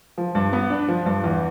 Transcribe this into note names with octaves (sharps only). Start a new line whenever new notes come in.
F3
G2
B3
D4
F3
G2
E2